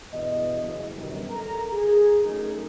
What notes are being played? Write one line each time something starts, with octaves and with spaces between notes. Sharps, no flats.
E2 G2 B2 D#5
F#1
F#2 B2 D3 D#3 G3
A4 A#4 A#5
G#4
F#3 A3 C#4 D#4 A4 A#4